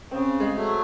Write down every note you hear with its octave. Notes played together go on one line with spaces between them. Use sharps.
C#3 C4
G#3
F#3 A3